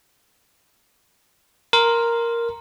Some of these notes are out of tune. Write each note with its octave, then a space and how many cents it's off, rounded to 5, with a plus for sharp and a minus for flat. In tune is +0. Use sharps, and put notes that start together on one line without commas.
A#4 +0 C6 +0